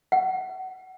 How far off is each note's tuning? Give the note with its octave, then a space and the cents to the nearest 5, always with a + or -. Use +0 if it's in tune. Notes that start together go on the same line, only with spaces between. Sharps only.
F#5 +25